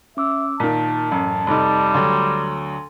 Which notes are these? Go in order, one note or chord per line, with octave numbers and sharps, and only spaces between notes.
C#4 E5 D6 E6
A#2 D#3 A5 B6
A1 F#2
F1 G3 D#4
D2 F#3 C6 A6